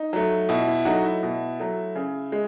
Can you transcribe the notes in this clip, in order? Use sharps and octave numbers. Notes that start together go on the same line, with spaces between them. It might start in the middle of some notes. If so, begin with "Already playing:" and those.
Already playing: D#4
F#3 A3
B2 E4
E4
F#3 A3 D#4 F#4
E4
B2
F#3 A3
C#3
G#3